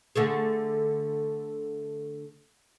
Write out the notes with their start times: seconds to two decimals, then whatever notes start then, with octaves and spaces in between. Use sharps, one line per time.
0.15 D3 A3 G#4